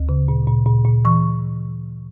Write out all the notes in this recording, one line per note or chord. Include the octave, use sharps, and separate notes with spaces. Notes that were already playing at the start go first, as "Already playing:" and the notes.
Already playing: D2
C#3
A#2
A#2
A#2
A#2
E3 C#6